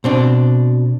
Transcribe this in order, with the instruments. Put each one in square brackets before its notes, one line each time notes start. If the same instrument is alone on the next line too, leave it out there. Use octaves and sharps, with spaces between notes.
[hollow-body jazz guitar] B2 C4 D4